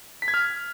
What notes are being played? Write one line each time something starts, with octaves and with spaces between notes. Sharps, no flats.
B6
G#6
F6